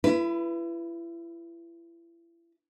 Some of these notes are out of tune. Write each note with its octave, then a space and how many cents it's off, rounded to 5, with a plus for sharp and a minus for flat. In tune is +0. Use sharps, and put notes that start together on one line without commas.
E4 +35 B4 +0